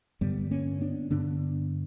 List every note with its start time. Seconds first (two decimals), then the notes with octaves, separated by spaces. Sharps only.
0.21 G2 D3 G3 B3
0.51 A#3 C#4
0.81 B3 D4
1.10 G2 D3 B3 D4